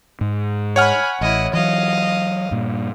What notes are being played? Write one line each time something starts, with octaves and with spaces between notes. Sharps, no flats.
G#2
C#5 F#5 G#5 B5 F6
A1 E4 D#5
E3 F#3 D#5 F5
G2 A#2